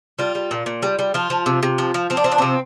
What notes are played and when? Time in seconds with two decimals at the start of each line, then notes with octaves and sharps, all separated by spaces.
0.19 G3 F4
0.35 G3
0.51 A#2
0.66 A#2
0.83 G3
0.99 G3
1.14 F3 F4
1.30 F3
1.46 C3
1.63 C3
1.78 F3
1.94 F3
2.10 F3 C4
2.17 D4
2.24 F3 C4
2.32 D4
2.38 C3 C4